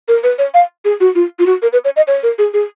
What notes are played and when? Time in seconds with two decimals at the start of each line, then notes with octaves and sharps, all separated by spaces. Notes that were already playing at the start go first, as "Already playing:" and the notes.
0.08 A#4
0.23 B4
0.38 C#5
0.54 F5
0.85 G#4
1.00 F#4
1.15 F4
1.39 F4
1.46 F#4
1.62 A#4
1.73 B4
1.85 C#5
1.96 D#5
2.07 C#5
2.23 A#4
2.38 G#4
2.54 G#4